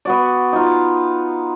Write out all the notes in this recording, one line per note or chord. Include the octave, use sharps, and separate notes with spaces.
B3 F#4 D5
D#4 F4